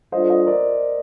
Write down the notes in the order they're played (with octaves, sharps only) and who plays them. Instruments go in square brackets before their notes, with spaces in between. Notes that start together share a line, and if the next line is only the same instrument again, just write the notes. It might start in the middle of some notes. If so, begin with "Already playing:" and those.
[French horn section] G3 D4 F4 A4 [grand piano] C5 D#5
[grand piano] C5 D#5
A#4 D5